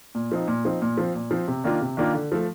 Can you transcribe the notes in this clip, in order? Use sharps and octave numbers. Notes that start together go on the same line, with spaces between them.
A#2
F3 C4 D#4
A#2
F3 C4 D#4
A#2
F3 C4
A#2
F3 C4
C3
D#3 A#3 D4 F4
C3
D#3 A#3 D4 F4
D3
F3 A3